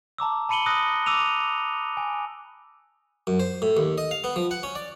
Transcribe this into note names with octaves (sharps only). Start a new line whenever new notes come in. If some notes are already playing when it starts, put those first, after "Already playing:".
A5 A#5 D6 E6
A5 B5 C#7 D#7 F#7 G7
D#6 E6 F#6 A#6
D6 E6 D#7 F7
G#5
F#2
C5
A2
D#2
D#5
F5
B3
F3
F#5
C#4
D5